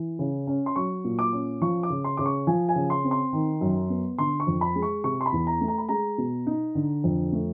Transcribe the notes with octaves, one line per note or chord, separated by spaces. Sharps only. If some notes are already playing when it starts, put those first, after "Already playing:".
Already playing: E3
C#3
C#4
C6
F#3 C#6
A#2
D6
C#4
F3 C#6
D6
C#3
C6
C#3 D6
C#6
F3 G#5
G#5
C#3
C6
C4
C6
D#3
F#2
B3
D3 C6
C#6
F2
B5
G#3
C#6
C3 C#6
C6
B5
E2
A#5
A3
A#5
B5
G#3 A#5
B2
D#4
D3
F2
A3